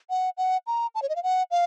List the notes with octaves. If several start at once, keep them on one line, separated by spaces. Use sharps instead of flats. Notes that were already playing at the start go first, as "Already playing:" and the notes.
F#5
F#5
A#5
A5
C#5
D#5
F5
F#5
F5